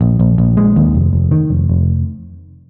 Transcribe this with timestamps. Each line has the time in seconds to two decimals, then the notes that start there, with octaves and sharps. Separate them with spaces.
0.01 A#1
0.19 A#1
0.38 A#1
0.57 G#3
0.76 D#2
0.95 F1
1.13 F1
1.31 D#3
1.50 F1
1.69 F1